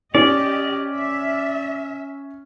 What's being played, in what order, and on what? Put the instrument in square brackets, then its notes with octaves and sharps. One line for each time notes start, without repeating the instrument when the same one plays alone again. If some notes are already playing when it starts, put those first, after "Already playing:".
[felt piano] C#4 [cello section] G4 D#5 [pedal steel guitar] D5
[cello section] E5